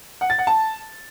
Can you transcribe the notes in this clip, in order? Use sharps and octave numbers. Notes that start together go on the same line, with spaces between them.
F#5
A6
F#5
A5